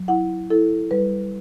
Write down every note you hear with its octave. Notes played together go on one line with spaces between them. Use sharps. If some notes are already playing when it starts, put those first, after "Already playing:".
Already playing: F#3
E4 F#5
E4 A4
G3 B4